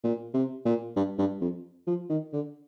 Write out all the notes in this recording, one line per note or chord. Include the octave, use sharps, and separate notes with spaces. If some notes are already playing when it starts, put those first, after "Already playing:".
A#2
C3
A#2
G2
G2
F2
F3
D#3
D3